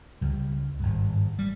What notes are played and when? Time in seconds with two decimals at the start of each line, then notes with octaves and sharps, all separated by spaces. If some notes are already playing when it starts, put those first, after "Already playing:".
0.21 C#2 C#3 G3
0.80 G#1 G2
1.39 G3